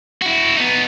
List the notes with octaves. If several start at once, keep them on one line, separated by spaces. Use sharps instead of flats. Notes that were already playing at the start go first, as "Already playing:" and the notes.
E4 F#4
B3 D#4